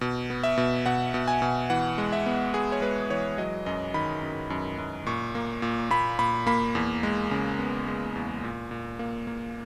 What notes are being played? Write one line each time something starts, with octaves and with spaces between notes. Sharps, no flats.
B2
B3
E5
B2
B2 F#5
B2
G#5
B2
E3 F#5
G#3
E5
B3
B3 G#4
C#5
G#3 B4
E3 C#5
F#3 D#5
F#2 D#5
D#3 B5
F#2
F#2
F#2
A#2 C#6
A#3
A#2
A#2 B5
A#2 B5
A#3 B5
E2
G#3
C#3
B3
G#3
E2
A#2
A#2
A#3
A#3